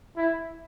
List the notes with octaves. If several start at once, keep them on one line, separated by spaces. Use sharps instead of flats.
E4